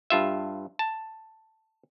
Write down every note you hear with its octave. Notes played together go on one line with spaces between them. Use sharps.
G2 F4 E5
A5